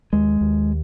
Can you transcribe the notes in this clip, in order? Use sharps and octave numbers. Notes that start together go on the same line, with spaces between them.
D#2 G#3
D#2